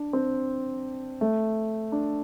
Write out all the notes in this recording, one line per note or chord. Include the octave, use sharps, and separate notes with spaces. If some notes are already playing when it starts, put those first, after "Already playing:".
Already playing: D4
C4
A3
D4